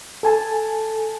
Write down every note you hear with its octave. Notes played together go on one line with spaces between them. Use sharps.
A4 G#5 A5